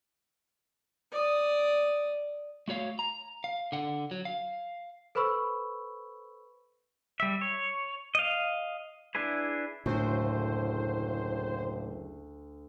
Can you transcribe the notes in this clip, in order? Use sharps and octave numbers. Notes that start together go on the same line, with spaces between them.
D5 D#6
A3 F#4 C#5 F5
A#5
F5
D3 F#5
F#3
F5
A4 B4 C5 B5 C#6 E6
G3 E5
C#5
D#5 F5
D4 E4 G#4 B4
F#1 D2 A2 C5